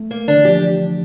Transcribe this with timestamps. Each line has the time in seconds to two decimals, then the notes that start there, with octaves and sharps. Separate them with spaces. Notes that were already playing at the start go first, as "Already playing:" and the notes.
Already playing: A3
0.11 A#3
0.28 D3 D4
0.36 E3
0.45 F3 G4